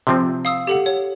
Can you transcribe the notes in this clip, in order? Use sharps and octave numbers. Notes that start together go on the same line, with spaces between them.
C3 F3 C4
F5 D#6 E6
G4 A4 F#5
C#5